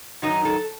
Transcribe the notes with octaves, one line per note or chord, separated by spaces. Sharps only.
F#2 D#3 F#3 D#4
A4